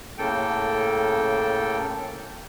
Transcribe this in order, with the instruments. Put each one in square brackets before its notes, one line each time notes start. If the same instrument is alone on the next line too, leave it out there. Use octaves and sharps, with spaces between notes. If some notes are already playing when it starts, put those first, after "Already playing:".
[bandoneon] A2 C#3 A#3 A4 G5